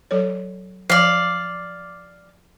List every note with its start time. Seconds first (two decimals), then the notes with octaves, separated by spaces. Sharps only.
0.11 F#3 A4 C#5
0.90 F3 C5 D5 F5